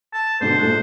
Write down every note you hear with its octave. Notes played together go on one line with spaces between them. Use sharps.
A5
G#2 B2 D3 C5
A#1 A3 F#6